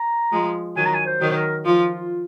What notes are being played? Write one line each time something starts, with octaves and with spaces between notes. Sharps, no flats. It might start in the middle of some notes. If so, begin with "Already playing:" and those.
Already playing: A#5
F3 G#3
D#3 F#3 G#5
A#5
G#5
C5
D#3 F#3
C5
A#4
F3 F4